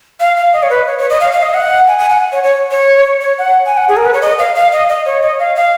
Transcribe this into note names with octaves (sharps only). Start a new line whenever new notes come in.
F5
F5
D#5
C#5
B4
C#5
C#5
D#5
F5
F5
D#5
F#5
G#5
G#5
F#5
C#5
C#5
C#5
C#5
F#5
G#5
F#5
G#4
A#4
B4
C#5
D#5
F5
F5
D#5
D#5
C#5
D#5
F5
F5